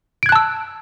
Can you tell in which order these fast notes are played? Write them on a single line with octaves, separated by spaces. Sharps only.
D7 G#6 F#6 A5 E6